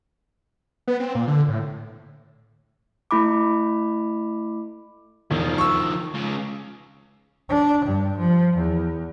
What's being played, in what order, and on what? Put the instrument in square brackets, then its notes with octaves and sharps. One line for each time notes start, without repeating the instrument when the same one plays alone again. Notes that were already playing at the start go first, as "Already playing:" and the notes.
[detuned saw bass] B3
C4
A#2
D3
A2
[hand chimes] A3 E4 B5 D6
[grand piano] E1 [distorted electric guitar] D#3 F3
[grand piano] C#6 E6
[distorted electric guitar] C#2 C#3
[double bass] D4
G2
F3
E2